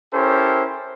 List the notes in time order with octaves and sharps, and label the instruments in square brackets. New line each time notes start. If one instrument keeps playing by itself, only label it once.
[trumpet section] C#4 E4 G4 A4 A#4 C5